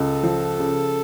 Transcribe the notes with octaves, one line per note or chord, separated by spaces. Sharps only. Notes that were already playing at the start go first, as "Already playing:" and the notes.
Already playing: C#2 A4
F3
C#3